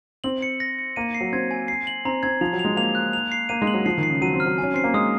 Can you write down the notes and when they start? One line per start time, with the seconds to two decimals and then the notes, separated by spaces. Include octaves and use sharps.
0.24 C4 F#7
0.42 C#7
0.60 A#6
0.79 C#7
0.96 A#3 D#7
1.14 C7
1.21 F#3
1.33 C4 G#6
1.51 G#5
1.68 C7
1.87 F#7
2.05 C4 A#5
2.23 C4 G#6
2.41 F3 F7
2.53 F#3
2.59 F7
2.65 G#3
2.77 A#3 F7
2.95 F#6
3.13 F7
3.32 C7
3.49 A#3 D#7
3.62 G#3
3.67 F#7
3.74 F#3
3.86 F3 C7
3.98 D#3
4.03 C7
4.10 C#3
4.21 F#3 D#7
4.33 C4
4.40 F6
4.46 F#3
4.58 G#5
4.64 C#4
4.74 C4 C7
4.84 A#3
4.94 G#3 D#6